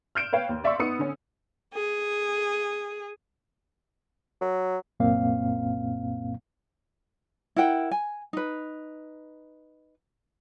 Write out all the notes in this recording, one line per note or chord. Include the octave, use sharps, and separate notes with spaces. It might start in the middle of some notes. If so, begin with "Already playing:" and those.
F6 G6 D7 E7
B4 C#5 F5 G5
D#2
D5 E5 F5 C6 C#6 E6
B3 D#4 D#6 C#7
D3 C#4
G#4
F#3
C2 F#2 A#2 A#3 C4 F5
E4 A#4 F#5 G5
G#5
D#4 B4